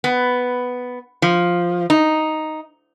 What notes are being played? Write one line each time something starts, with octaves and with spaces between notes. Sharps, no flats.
B3
F3
D#4